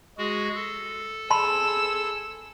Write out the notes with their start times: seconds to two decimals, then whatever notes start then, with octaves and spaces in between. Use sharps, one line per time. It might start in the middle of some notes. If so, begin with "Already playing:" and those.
0.18 G#3 F#4 G#4
0.55 A4
1.30 G#4 A5 B5 C6 E6